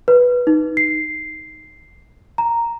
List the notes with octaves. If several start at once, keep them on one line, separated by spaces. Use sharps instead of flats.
B4
D#4
C7
A#5